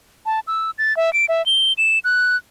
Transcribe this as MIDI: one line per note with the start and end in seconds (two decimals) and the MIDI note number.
0.26 0.40 81
0.47 0.71 88
0.78 0.96 93
0.97 1.13 76
1.13 1.25 98
1.29 1.44 76
1.46 1.73 103
1.78 1.99 100
2.04 2.36 90